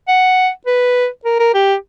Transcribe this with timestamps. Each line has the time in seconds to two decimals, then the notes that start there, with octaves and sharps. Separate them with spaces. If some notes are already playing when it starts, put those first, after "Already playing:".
0.08 F#5
0.66 B4
1.25 A#4
1.39 A#4
1.54 G4